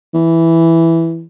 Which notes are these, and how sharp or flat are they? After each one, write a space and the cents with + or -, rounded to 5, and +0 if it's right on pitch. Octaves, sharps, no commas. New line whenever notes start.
E3 +0